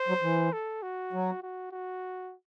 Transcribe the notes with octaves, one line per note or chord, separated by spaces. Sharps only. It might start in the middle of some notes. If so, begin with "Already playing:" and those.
Already playing: C5
F#3
E3
A4
F#4
F#3
F#4
F#4